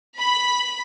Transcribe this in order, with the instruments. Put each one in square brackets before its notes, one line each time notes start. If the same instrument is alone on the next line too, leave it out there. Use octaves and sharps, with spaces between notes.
[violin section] B5